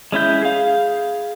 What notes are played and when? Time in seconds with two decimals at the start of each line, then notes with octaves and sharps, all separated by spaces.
0.12 G#3 C#4 E4 G6
0.43 G#4 F5